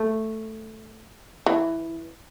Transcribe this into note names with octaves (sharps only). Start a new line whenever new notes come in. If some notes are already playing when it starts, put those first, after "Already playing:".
Already playing: A3
E3